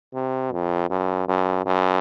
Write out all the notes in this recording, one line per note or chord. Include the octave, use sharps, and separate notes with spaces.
C3
F2
F#2
F#2
F#2